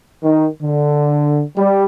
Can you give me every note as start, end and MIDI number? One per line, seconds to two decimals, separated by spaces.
0.23 0.46 51
0.62 1.42 50
1.56 1.85 55